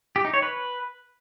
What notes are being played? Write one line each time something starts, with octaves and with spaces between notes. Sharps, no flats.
G4
D#4
C#5
B4